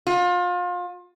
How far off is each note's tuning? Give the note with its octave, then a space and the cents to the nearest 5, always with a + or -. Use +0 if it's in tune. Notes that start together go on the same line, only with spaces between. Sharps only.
F4 +30